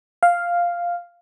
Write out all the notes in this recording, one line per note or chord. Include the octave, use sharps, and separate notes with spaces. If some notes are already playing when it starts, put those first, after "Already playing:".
F5